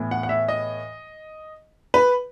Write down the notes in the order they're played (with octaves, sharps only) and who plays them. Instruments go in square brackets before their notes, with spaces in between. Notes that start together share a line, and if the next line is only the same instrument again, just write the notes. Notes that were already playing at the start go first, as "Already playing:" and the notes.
Already playing: [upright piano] A2 E3 B3
F#5
F#5
E5
D#5
B4